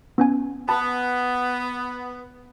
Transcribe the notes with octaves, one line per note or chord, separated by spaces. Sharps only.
B3 C#4 G#5
B3 A5 B5